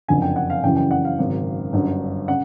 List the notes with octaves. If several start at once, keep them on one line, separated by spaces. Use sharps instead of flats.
F#1 F2 D3 G#5
G5
F#5
F5
F#1 F#2 C#3 E3 G5
G5
F#5
F5
G#1 F#2 C#3
G1 F#2 D3
C#3 F#5